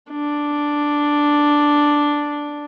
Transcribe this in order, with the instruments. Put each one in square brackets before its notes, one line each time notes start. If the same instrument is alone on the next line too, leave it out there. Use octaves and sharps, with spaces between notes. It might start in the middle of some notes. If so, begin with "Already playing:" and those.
[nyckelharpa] D4